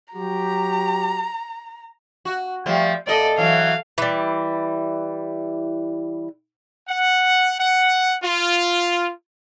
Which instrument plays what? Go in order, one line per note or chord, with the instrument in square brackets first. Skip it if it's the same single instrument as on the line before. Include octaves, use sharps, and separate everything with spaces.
[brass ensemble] F#3 F#4 G4 [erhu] A#5
[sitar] F#4
F3 G3 A3
[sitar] A#2 D#5 [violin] A4 D5
[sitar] E3 F#3 [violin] F5
[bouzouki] E3 G3
[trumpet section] F#5
F#5
F4